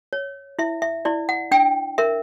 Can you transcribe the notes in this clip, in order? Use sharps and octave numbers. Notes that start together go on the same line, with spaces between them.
C#5
E4 E5
E5
E4 D5
F#5
D4 G5
A#4 E5